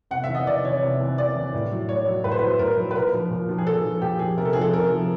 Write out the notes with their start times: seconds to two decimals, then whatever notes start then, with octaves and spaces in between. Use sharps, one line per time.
0.11 C3 F#5
0.24 E5
0.28 E3
0.35 D#5
0.47 C3 D5
0.64 E3 C#5
0.82 C3
1.01 E3
1.18 C3 D5
1.36 E3
1.54 A2
1.71 F#3
1.88 A2 C#5
2.07 F#3
2.24 A2 B4
2.31 C5
2.39 F#3 B4
2.59 A2 A#4
2.77 F#3
2.91 B4
2.95 A#2 A#4
3.13 F3
3.30 A#2
3.49 F3
3.58 G#4
3.66 A#2 A4
3.85 F3
4.02 A#2 G4
4.19 F3 G#4
4.37 C3 A#4
4.45 A4
4.53 F3 G#4
4.61 A4
4.73 C3 A#4
4.90 F3